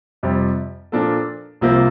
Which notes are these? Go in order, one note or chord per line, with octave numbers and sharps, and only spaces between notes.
F2 C3 G3
A#2 F3 A#3 D4 A4
C2 C3 F3 A#3